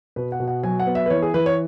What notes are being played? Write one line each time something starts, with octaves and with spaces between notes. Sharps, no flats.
B2 B4
F#5
B2
F#5
F#3 G#5
F#5
B3
E5
B4
E3 C#5
G#4
E3 B4
C#5